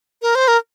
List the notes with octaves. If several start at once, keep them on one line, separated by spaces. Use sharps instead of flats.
A#4
C5
A#4